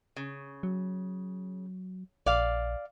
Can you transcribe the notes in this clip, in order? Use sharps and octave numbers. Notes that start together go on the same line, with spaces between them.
C#3
F#3
A#1 D5 F5